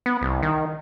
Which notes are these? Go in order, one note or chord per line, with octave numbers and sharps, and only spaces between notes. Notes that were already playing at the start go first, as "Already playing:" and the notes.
B3
C2
D#3